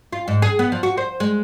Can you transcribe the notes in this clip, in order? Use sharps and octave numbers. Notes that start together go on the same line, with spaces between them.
F4
G#2
G#4
B3
F3
F#4
C5
G#3